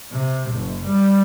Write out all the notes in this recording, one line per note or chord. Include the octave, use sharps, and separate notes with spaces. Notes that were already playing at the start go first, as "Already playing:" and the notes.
C3
F#1
G3